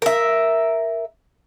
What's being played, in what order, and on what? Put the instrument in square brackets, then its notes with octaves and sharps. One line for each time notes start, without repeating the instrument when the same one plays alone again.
[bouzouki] A#4 E5